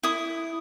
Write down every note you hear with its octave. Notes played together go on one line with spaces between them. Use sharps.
E4 D#6